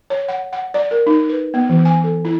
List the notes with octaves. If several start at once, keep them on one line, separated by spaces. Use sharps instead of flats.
C#5
F#5
F#5
D5
A#4
D#4
B4
B3
E3
G#5
A4
E4